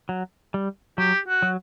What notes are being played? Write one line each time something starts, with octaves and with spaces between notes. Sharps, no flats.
F#3
G3
F#3 G4
F#4
F#3